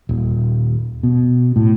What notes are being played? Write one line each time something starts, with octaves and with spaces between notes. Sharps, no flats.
D#1
B2
A2